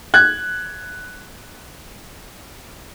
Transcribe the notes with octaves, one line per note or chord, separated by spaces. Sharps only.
F#6 G#6